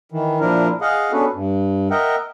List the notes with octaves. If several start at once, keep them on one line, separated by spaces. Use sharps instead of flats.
D#3 E3
A#2 F3 D4 E4 A#4
G#4 D#5 F5 F#5
B3 C#4 D4 F#4 A4 B4
G2
A#4 D#5 E5 F#5 G5